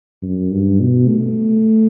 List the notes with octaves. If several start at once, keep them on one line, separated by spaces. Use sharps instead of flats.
F#2
G2
B2
A3